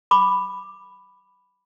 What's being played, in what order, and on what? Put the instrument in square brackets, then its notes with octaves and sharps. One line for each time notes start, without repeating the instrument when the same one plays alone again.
[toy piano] B5 D6